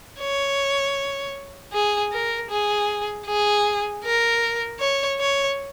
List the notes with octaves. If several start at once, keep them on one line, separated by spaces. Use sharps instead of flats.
C#5
G#4
A#4
G#4
G#4
A#4
C#5
C#5